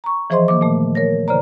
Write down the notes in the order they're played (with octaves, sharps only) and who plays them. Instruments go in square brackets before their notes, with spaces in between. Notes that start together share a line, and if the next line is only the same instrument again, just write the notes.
[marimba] A#5 C#6
E3 F3 G#4 C5 D#5 C6
D#3 A#3 D6
A#2 A3
A#4 C#5 A#6
D#2 C#3 C5 D5 A#5